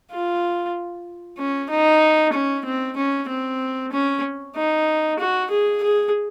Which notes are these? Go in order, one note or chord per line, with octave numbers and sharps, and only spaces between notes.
F4
C#4
D#4
C#4
C4
C#4
C4
C#4
D#4
F#4
G#4
G#4